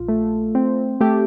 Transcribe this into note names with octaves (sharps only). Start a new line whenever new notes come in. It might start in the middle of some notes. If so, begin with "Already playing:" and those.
Already playing: A#1 F4
A3
C4
A3 G4